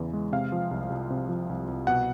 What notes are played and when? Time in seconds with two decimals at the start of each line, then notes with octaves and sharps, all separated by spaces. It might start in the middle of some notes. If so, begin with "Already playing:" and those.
Already playing: E2 C#3 E3
0.13 G#3
0.32 C3 F5
0.52 F3
0.71 C2
0.90 C2
1.10 C3
1.29 F3
1.49 C2
1.68 C2
1.87 B2 F#5